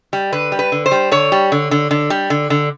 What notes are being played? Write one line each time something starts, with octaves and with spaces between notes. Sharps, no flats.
G3
D3 B4
G3
B4
D3
C5
G3
D3 C#5
G3
D3
D3
D3
G3
D3
D3